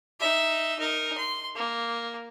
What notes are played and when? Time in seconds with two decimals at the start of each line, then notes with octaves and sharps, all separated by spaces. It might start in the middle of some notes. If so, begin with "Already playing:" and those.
0.20 D#4 E5
0.79 D#4 A#4
1.17 C6
1.55 A#3